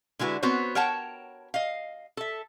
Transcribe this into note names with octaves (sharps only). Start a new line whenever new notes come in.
D3 G#3 E4 F#4 B4
B3 C4 F#4 C5 C#5
A#4 C#5 F#5 G5 A5
D#5 F5
A4 E5